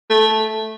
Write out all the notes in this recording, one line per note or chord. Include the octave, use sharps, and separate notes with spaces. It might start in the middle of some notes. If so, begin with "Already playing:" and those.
A3